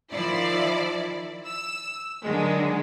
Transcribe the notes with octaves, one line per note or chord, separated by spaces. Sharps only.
D#3 F3 E4 D5
E6
D3 D#3 F#3 G#3